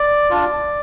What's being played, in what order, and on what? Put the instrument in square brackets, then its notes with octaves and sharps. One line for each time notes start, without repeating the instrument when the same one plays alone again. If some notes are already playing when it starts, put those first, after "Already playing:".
Already playing: [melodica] D5
D4 F4